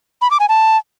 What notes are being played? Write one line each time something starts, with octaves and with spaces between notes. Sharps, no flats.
B5
D6
G#5
A5